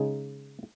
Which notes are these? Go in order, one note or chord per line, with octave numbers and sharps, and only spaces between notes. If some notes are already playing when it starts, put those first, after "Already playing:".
Already playing: C#3 G#3 D#4